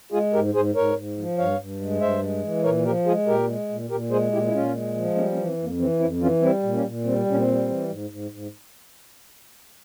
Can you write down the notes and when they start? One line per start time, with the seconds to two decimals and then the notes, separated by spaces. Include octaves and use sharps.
0.12 G#3 F4 G#4
0.33 G#2 G4 A#4
0.54 G#2 G#4 C5
0.75 G#2 A#4 C#5
0.96 G#2
1.17 F3
1.38 G2 C#5 F5
1.59 G2
1.81 G#3
2.01 G2 C5 E5
2.22 G#3
2.43 E3
2.64 A#2 A#4 C#5
2.85 F3 G4 A#4
3.06 G#3 F4 G#4
3.27 A#2 G4 A#4
3.48 G#3
3.69 A#2
3.90 A#2 G4 A#4
4.10 G#3 G#4 C5
4.32 A#2 E4 G4
4.47 E4
4.53 A#2 C#4 F4
4.74 G#3
4.95 F3
5.16 G3 A#3 C#4
5.31 A#3 C#4
5.37 E3
5.48 C4
5.58 F2
5.64 A#3
5.79 E3 C4
5.99 F2 C4 E4
6.21 E3 C#4 F4
6.41 G3 C4 E4
6.63 A#2
6.73 A#3 C#4
6.84 A#2
7.04 G3 C4
7.26 A#2 C#4
7.37 C4
7.47 G3
7.68 E3
7.89 G#2
8.10 G#2
8.31 G#2